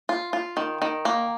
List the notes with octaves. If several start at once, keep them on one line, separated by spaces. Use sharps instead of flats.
F4
F4
D#3
D#3
A#3